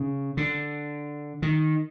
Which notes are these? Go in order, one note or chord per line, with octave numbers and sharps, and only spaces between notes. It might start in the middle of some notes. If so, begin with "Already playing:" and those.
Already playing: C#3
D3
D#3